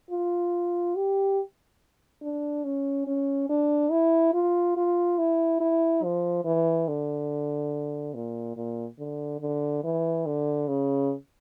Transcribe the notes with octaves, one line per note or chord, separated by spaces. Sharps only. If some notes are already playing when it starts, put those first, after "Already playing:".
F4
G4
D4
C#4
C#4
D4
E4
F4
F4
E4
E4
F3
E3
D3
A#2
A#2
D3
D3
E3
D3
C#3